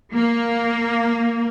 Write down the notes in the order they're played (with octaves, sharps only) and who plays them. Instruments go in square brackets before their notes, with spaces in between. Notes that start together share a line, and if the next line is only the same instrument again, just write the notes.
[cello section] A#3